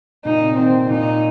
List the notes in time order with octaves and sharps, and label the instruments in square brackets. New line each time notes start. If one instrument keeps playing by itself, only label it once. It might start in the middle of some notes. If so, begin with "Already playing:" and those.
[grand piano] A#2 [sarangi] D#4
[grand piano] C3
[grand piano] D#3 [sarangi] C4
[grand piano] C3
[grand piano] A#2 [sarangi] D#4